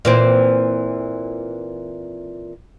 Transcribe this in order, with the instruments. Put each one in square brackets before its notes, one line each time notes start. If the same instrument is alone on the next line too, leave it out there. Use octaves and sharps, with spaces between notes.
[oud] A#2 E3 C4